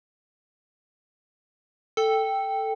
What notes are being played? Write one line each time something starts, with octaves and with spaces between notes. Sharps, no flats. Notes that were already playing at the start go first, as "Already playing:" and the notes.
A4 G5